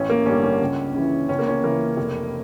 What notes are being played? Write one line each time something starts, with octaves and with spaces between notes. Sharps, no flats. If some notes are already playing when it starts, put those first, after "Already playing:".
Already playing: A1 C#4
A#3
G2 D3 G3 C#4
C#4
C#2
C#3 E3
C#2 C#4
A#3
C#4
C#3 E3 A#3
F1